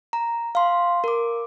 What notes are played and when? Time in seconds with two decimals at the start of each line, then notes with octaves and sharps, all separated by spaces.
0.13 A#5
0.55 F5 C6
1.04 A#4 D6